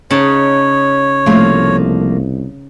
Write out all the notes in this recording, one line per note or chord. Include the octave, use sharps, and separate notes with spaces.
C#3 D#4 C#5 A5
C2 F3 A3 A#3